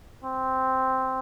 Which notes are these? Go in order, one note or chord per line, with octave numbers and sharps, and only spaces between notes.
C4